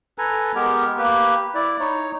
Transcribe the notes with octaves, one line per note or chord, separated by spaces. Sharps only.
A4 B4 G#5 A#5
G#3 B3 G4 A#4
A#3 G4 B4
E4 D5
D#4 C#5